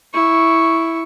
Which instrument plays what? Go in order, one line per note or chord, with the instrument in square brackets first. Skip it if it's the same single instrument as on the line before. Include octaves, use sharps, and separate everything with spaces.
[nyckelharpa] E4 C#6